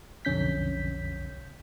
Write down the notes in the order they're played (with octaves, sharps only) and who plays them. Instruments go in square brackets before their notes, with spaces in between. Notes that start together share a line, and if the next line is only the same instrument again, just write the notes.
[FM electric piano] B1 F2 D3 C#4 G6 B6